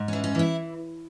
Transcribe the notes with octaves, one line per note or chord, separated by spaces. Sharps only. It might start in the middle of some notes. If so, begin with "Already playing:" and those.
Already playing: G#2
E3 C#4
C#4
E3 E4